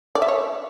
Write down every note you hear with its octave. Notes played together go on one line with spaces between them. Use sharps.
D5
E5
C#5